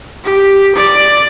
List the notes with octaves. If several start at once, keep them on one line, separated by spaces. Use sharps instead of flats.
G4
D5